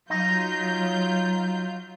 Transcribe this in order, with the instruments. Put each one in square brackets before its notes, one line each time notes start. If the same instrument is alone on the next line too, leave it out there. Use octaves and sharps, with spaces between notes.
[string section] F#3 F4 G6 [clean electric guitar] D#4